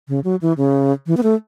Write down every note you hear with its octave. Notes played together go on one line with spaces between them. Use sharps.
C#3
F#3
E3
C#3
E3
B3
A3